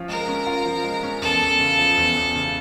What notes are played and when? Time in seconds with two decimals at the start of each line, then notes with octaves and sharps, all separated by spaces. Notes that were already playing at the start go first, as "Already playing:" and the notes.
Already playing: F3 C#4 F4
0.09 G#3 A#4
0.28 C#4
0.46 F4
0.65 F3
0.84 G#3
1.03 C#4
1.22 E2 A4
1.41 E2
1.60 C#3
1.78 F3
1.97 E2
2.17 E2
2.35 C#3